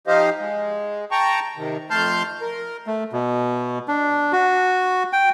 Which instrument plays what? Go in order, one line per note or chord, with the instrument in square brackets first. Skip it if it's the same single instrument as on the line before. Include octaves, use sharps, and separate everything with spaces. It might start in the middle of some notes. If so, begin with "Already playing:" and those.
[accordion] F3 D#4 G4 C5 D#5 F5
G#3
G5 A5 A#5 C#6
C3 D#3
F2 A3 A5 C6 F6 G6
A#4
[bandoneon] A3
B2
D4
F#4
G5